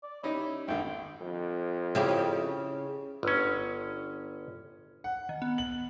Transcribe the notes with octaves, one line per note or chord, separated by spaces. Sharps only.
D5
C#4 D#4 E4 G4
G#1 D3 G5
F2
C#3 E4 G4
G1 C#4
F#5
D#3
B3
F#7